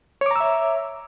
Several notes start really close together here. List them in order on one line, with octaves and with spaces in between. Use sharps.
C#5 D6 A#5 E6 E5